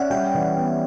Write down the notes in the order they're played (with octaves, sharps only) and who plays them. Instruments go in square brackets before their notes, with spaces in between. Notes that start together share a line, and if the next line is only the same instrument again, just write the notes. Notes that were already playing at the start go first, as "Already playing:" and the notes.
Already playing: [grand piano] C#4 [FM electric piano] D5 E5 F#5
[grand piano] G3 [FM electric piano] G5
[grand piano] E3
B3